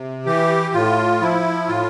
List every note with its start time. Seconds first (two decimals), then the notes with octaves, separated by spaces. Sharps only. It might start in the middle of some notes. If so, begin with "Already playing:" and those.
Already playing: C3
0.26 E3 G4
0.74 A2 F4
1.21 F3 E4
1.68 A2 F4